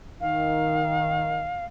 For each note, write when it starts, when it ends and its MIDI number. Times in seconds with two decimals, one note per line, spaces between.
0.21 1.51 51
0.21 1.65 77